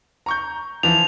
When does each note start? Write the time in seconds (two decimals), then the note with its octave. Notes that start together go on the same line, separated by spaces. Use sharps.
0.26 A#5 C#6 G6
0.83 E3 F3 F7